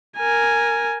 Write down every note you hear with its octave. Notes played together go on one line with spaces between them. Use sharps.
A#4 G#5